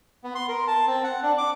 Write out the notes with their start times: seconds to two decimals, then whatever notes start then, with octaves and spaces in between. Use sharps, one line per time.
0.24 B3
0.35 C6
0.48 A#4
0.67 A5
0.87 C4
1.04 F#5
1.23 D4
1.38 D6